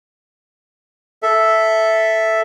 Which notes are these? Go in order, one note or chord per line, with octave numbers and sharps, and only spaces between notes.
A4 E5